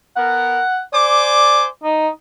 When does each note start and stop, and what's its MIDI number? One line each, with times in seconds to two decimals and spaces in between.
0.17 0.64 59
0.17 0.64 70
0.17 0.81 78
0.93 1.69 72
0.93 1.64 74
0.93 1.69 80
0.93 1.69 86
1.84 2.08 63